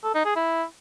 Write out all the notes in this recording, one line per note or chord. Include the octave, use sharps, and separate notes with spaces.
A4
D#4
G#4
E4